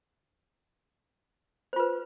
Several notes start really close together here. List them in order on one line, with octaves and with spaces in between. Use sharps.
C5 F4 B4